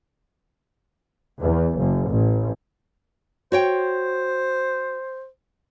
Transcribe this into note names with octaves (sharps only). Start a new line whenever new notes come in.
E2
F#1
A1
F#4 C5 C#5 G5